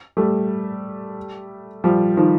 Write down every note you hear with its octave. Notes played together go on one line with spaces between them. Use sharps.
G3 A3
F3 G3
D#3 F3